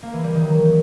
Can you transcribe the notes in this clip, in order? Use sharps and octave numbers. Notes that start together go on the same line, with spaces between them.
A#3
E3
G3
D#3
F#3